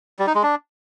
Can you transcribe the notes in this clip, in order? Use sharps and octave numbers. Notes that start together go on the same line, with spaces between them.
G3
D#4
G#3
D4